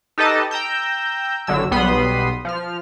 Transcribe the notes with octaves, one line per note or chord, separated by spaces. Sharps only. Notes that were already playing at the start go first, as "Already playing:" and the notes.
D#4 G4 A4 B4 D#5 A5
G5 A#5 E6 G6
G1 D3 F#3 E6
B1 G3 B3 B5 C6 D#6
F3 F6